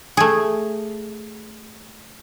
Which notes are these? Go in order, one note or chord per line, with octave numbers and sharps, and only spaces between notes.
A3 G#4